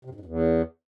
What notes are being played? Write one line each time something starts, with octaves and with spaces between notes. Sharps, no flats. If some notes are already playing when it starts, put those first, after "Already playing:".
C3
F#2
G#2
F#2
E2